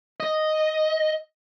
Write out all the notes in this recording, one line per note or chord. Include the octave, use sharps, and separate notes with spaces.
D#5